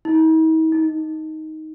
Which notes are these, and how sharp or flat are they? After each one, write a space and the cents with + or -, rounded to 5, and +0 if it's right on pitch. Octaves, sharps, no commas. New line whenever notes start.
D#4 +45
D#4 +10